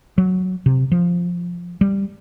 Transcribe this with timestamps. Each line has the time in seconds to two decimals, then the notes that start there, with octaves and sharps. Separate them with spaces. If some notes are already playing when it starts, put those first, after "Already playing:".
0.18 F#3
0.66 C3
0.92 F3
1.81 G3